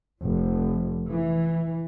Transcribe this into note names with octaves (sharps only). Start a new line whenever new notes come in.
F1
E3